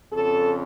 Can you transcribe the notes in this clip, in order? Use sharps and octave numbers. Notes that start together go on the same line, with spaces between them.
F2 C#3 A4